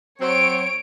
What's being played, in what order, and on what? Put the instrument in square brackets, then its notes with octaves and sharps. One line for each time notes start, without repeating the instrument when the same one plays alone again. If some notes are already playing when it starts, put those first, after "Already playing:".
[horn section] F#3 C4 [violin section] C#5 D7